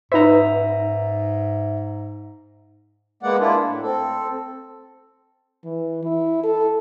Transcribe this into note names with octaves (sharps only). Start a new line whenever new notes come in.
G#2 D#4 B4 E5 A#5
G#3 A#3 B3 D5 F#5
A#3 D4 E4 F4
A2
C4 A4
E3
E4
A4